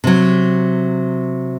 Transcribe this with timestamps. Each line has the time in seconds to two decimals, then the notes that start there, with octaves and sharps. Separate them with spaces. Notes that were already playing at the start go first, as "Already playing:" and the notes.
0.04 C3 F#3